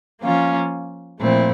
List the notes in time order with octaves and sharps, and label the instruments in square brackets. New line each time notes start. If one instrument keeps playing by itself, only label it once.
[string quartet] F3 A#3 C#4 F4
A#2 F3 A3 C4 E4